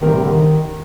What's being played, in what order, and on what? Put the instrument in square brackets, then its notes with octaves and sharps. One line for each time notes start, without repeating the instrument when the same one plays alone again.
[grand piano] A2 G3 C4 G4 A#4 [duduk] D#3
[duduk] C3
D3
D#3